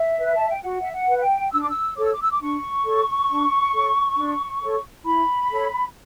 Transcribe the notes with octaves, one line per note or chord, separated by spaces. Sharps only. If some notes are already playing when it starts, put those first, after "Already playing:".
Already playing: E5
B4
A5
G5
F#4 F#5
E5
F#5
B4
F#5
G5
D4 E6
D6
E6
A4 C#5 D6
E6
D6
E6
D6
D4 C#6
A4 C#5
D4
A4 C#5
D4
A4 C#5
E4 B5
A4 C#5